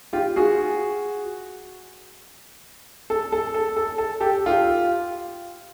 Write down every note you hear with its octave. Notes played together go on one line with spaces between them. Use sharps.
F4 G4
F#4 G#4
A4
A4
A4
A4
A4
G4 A4
F4 G4